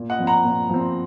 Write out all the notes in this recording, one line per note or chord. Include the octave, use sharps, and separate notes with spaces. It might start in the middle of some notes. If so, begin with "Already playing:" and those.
Already playing: A#2
D#5 F#5
F3 C4
F#5 A#5
A#2
F3 C4